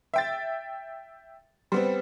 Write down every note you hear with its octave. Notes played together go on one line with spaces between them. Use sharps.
E5 G5 A6
G3 B3 C4